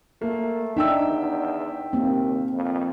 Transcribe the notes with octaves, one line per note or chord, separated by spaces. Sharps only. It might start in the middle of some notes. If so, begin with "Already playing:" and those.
A3 A#3
D4 D#4 E5 G5 E6
E2
D#2 A#3 C4
F2